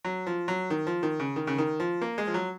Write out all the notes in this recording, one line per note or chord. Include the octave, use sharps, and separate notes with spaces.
F#3
F3
F#3
D#3
F3
D#3
C#3
D#3
C#3
D#3
F3
A#3
G#3
F3
F#3